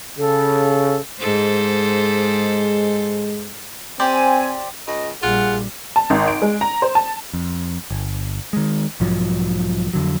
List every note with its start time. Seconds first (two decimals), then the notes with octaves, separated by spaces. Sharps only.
0.19 C#3 A4
1.19 G#2 G#3 A4 C5
4.00 C4 G4 C5 D5 G#5
4.87 C#2 D#5
5.23 A#1 G3 F4 G#4 F#5
5.96 A5
6.10 G#1
6.28 D7
6.42 G#3
6.61 A#5
6.82 C5
6.95 A5
7.33 F2
7.91 G1
8.53 D#3 G#3
9.00 B1 G#2 F3 F#3
9.94 F2 D3 F#3